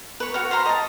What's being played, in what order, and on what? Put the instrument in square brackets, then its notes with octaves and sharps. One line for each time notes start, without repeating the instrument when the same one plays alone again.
[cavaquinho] B4 C#5
F#4 C#5 F5
C5 F5 A#5 B5
D#5 A5